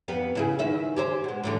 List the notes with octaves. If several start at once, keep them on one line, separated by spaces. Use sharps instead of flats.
F2 B3 G4
C#3 E4 G#4
D#3 B4 E5
G4 G#4 C5
B2 G#3
A2 D3 E3